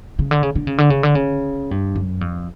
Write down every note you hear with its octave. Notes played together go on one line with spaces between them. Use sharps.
C#3
D3
C#3
D3
C#3
D3
C#3
D3
C#3
G2
F#2
F2